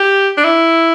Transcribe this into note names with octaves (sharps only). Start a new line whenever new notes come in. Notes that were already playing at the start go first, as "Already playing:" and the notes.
Already playing: G4
D4
E4